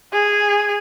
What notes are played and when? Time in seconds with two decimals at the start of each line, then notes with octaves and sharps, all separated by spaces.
0.13 G#4